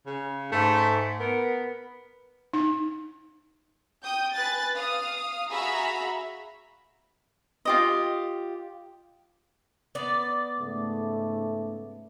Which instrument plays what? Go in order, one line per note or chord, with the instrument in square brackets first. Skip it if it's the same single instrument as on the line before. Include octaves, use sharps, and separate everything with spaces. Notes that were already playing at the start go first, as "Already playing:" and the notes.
[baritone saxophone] C#3
[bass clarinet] G#2 [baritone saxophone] A3
[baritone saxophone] B3 [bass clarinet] A#4
[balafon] D#4
[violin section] G5 D#6 G6
B4 G#5 F#6 A6
F5 D#6
F#4 G#4 E5 F5 A#5 B5
[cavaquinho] F4 G4 D#5
[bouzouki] B3 D5
[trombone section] G#2 C#3 A3